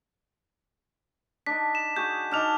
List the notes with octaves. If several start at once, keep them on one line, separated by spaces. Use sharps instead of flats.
D4 D#4 B6
E7
F#4 G#4 G6
D4 D#4 D6 F6 F7